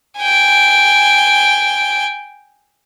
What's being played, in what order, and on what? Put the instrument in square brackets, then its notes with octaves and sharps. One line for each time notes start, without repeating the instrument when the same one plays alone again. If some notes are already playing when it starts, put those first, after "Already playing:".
[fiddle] G5 G#5